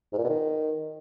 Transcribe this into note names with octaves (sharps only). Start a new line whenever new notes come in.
G#2
A#2
B2
D#3